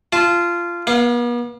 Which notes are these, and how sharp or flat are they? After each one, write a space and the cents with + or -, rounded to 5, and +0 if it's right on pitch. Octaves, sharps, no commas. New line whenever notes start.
F4 -15 A5 -15
B3 -45 F5 +0